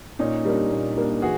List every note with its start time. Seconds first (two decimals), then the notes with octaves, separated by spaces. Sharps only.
0.19 A#2 C#4 D#4
0.45 G3 A#3 D4
0.71 A#2
0.97 G3 A#3 D4
1.22 E3 F#4 G#4